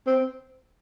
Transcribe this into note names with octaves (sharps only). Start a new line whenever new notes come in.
C4